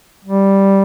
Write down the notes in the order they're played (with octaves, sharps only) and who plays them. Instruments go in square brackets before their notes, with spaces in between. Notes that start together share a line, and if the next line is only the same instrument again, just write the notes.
[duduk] G3